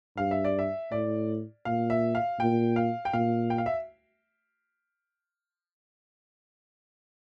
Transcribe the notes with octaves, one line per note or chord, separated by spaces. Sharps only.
G2 F5
E5
D5
E5
A2 D5
A#2 F5
E5
F5
A#2 G5
F5
G5
A#2 F5
G5
F5
E5